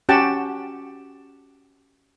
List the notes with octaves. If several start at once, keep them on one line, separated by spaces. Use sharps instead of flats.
C#4 F#4 G4 F#5 G5 A5